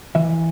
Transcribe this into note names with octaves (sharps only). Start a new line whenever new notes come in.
E3 E5